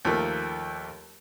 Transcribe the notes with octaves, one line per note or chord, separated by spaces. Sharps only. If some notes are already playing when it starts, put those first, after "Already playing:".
D#2 F3 A3 A#3